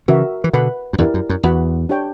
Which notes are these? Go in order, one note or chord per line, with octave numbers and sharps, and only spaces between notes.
C#3 E3 F#4 A#4 E5
E3
B2 D3 B4 F#5 B5
F#2
E2 G2 E4 G4 A#4 D5
F#2
F#2
E2 F#4 B4 F#5 B5
D4 G4 C#5 G5